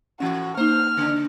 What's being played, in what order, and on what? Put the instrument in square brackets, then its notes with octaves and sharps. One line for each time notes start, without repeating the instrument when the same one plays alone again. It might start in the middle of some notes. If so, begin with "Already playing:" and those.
[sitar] A2 E3 [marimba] C#4 [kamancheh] F#4
[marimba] A#3 D#4 [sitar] C5 [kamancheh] F6
[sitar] C#3 D4